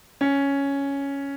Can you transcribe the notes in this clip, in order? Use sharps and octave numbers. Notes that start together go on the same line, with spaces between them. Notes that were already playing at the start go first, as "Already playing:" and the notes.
C#4